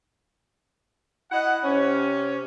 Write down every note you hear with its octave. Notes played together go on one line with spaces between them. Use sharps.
E4 D#5 F#5
C3 C#4